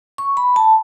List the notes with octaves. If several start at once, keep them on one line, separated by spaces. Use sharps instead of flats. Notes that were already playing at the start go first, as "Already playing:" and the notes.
C#6
B5
A5